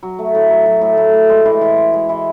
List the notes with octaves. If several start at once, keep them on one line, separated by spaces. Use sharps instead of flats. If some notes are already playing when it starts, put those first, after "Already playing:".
F#3
A3
A2
F#3
F#3
A2
A2
A2
G#3
E3
E3
G#3
G#3
E3